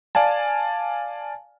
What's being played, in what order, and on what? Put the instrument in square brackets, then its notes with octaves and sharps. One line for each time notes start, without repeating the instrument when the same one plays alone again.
[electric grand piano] D5 F5 G#5 A5